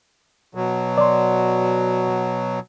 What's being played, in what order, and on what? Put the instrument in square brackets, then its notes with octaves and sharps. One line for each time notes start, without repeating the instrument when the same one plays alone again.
[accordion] B2 F#3
[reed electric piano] D5 C6